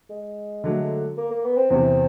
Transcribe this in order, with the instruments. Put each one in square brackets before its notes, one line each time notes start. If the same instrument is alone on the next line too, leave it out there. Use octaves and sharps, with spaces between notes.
[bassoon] G#3
[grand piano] D3 F#3 A3
[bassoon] A#3
A#3
B3
C4
[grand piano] E2 C3 E3 [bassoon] C4